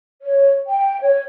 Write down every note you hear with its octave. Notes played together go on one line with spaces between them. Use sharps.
C#5
G5
C#5